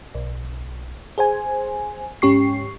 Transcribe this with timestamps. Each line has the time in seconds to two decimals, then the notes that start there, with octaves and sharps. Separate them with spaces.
0.15 B1
1.18 G#4 C5 G#5
2.22 G#2 C#4 G4 C#6 C7